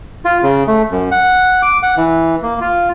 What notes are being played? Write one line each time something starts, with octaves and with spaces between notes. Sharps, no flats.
F4
C#3
A3
F#2
F#5
D6
F#5
E3
A#3
F4